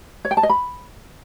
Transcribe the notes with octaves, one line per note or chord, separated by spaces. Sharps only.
C#5
G5
A5
D#5
B5